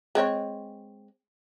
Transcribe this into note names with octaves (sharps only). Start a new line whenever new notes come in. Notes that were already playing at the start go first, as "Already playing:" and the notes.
G#3 C4 C#5